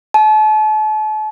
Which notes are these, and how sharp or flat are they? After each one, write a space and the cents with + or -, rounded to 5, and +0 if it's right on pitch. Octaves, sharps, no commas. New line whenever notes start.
A5 -40